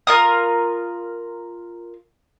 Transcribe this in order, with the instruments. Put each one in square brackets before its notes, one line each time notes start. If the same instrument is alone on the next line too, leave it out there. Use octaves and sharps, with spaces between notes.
[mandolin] F4 A#4 D#6